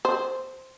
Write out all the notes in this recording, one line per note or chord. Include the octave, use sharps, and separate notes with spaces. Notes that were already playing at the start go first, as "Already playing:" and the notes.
C5